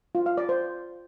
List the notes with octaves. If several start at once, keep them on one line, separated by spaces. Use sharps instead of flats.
F4
F5
D5
C5